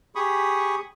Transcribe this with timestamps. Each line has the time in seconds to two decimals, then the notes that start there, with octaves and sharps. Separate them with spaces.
0.15 G4 G#4 B5 C#6 D#6